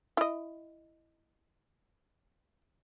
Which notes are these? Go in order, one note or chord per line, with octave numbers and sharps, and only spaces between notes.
E4 D#5